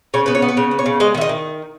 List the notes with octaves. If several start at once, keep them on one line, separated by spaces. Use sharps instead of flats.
C#3 C#5
B3 B4
C#5
B3
B4
C#3 C#5
B3
C#5
C#3
G#3 D#5
D#3 E5
D#5
D#3